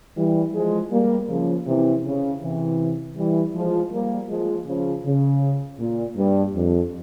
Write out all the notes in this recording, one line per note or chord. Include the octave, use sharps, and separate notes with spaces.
E3 G3
F3 G#3
G3 A#3
C#3 F3
C3 E3
C#3
C3 E3
E3 G3
F3 G#3
G3 A#3
F3 G#3
C#3 F3
C#3
A#2
G2
F2